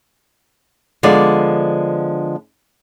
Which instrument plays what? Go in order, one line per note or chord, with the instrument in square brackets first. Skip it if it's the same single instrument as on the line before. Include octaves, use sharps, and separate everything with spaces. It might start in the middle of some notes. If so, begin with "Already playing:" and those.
[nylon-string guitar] D3 F3 G#3 B3 D5